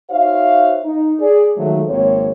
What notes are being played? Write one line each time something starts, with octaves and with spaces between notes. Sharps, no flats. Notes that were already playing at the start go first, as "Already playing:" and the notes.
D#4 F#4 C5 C#5 E5 F5
D#4
G#4 D5
D#3 F3 F#3 G#3 A3
G#1 F3 A#3 C4 C#5